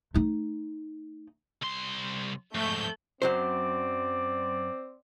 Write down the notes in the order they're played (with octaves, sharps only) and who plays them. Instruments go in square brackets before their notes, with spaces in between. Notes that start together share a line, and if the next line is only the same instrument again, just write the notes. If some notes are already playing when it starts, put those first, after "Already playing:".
[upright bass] A3 D#4
[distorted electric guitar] C2 C6
[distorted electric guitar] F2 G#2 [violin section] A3 G6
[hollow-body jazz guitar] F#2 F#3 C5 [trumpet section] C4 D5